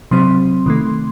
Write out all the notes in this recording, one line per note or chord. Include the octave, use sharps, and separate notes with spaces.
C3 F#3 C4 C6
C3 D#3 A3